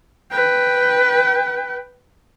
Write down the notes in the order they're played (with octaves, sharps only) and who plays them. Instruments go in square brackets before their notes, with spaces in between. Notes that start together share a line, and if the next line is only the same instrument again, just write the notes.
[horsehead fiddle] B4 G5